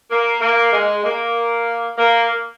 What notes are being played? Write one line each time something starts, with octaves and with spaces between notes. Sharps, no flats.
A#3
A#3
G#3
A#3
A#3